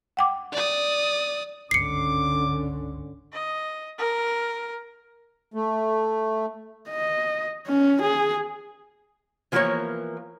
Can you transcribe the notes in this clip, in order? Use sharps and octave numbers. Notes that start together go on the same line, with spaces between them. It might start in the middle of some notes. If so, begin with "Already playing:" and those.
F#5 G5 D6
D5 D#6
G1 C#2 G#2 D3 C#4 D6 C7 C#7
D#5
A#4
A3
D#5
C#4
G#4
E3 F3 A#3 B3 A#4 C#5